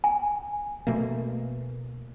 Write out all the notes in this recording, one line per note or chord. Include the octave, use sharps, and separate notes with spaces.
G#5
B2 A3 A#3